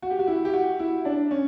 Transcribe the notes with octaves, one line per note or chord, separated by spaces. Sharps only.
F#4
G4
F#4
E4
G4
F#4
E4
D4
C#4